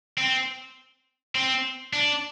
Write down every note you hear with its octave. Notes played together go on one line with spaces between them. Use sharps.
C4
C4
D4